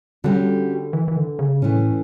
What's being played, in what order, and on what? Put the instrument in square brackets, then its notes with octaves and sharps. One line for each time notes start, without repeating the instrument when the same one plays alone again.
[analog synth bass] D3 [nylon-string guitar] G3 C#4 F#4 A4
[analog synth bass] E3
E3
D3
C#3
[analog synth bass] A2 [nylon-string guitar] E3 A3 C#4